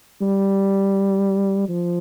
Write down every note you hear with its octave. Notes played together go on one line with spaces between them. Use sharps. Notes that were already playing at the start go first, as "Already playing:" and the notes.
G3
F3